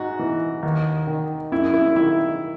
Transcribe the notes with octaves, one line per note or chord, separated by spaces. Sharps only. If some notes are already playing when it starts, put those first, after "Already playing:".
Already playing: G#2 F#4
E3
D#2
D#3
F#2 E4
E4
D#3 E4